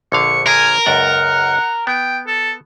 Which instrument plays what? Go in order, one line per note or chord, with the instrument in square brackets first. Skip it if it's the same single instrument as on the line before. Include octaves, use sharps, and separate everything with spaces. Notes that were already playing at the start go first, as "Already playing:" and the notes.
[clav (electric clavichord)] A#1 D3 F5 [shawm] C#6
[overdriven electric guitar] A#4 [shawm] G#5
[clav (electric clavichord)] C#2 F#2 D5 [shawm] F#5
[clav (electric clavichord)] B3 [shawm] G5
[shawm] A4